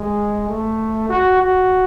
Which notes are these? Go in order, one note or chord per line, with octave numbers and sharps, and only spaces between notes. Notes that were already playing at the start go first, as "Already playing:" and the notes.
Already playing: G#3
A3
F#4
F#4